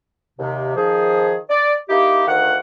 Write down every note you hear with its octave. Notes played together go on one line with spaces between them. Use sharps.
D#2 C3
D#3 F3 G#4
D5
A#3 D#4 E4 G4
D2 D#3 F5 F#5